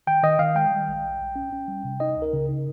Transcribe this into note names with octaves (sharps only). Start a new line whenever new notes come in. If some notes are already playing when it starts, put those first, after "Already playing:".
D#3 G5
D#3 D#5
D#3 F5
G#3 G5
G3
A#1
A#1
A#1
C#4
C#4
G3
C3
D#4 D#5
C#2
A#4
C#3
D#4